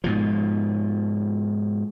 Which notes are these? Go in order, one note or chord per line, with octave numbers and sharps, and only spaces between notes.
G#2 B2 F3